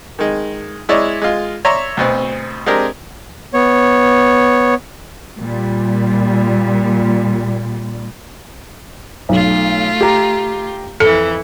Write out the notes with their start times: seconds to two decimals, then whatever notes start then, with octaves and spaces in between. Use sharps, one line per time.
0.19 D#3 G#3
0.89 G#3 E4 C#5 D5
1.22 G#3 F4
1.65 C#5 D5 E5 A#5 C6
1.97 D2 B2 C4
2.66 G#3 C4 D4 G4 G#4 A#4
3.54 B3 C#5
5.39 A#2 G3
9.29 B1 A3 F4
10.01 G4 A#5
11.00 F2 E3 A4 C#7